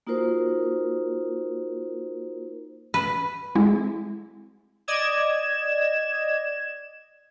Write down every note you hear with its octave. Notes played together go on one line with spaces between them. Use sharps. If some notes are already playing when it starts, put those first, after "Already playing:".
A#3 D#4 F4 F#4 A#4 C5
B4
G#3 A3 C4 E4 F#4 G#4
D5 D#5 G#6 E7